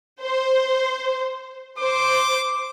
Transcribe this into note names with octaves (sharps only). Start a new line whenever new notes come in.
C5
C5 D6